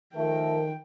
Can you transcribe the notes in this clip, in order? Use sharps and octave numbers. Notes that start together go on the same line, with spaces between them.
D#3 F3 A3 A#4 G5